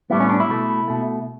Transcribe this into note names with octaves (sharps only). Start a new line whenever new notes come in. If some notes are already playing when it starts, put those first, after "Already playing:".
A2 G3 B3 E4
C#4
D4
E4
B2 A3
B2 A3